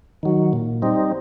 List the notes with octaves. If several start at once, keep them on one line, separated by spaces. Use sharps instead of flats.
D#3 F#3
A#2
G3 C4 D#4